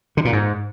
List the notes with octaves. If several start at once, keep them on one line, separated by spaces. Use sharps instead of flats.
D3
A#2
G#2